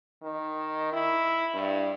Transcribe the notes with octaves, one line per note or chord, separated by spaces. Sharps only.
D#3
E4
G2